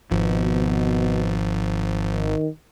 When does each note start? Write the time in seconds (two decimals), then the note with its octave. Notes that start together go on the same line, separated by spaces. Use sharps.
0.11 G#1 B2 F3
2.10 D#3